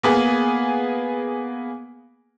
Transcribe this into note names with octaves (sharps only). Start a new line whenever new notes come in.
A#3 B3 G#4